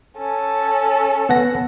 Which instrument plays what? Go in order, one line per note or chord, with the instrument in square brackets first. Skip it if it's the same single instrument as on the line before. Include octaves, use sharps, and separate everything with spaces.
[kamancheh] C#4 A4
[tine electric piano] B3 F#5 A#6